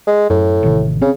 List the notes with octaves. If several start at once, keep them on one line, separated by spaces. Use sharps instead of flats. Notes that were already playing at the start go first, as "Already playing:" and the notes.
G#3
F#2 A2
A1 C3 D#3
C#3 C4